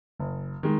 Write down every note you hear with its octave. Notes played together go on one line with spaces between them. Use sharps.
F#1
D#3 G#3